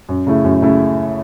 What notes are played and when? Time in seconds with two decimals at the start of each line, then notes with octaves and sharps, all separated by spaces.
0.09 F#2
0.27 C#3 A3 E4
0.44 F#2
0.62 C#3 A3 E4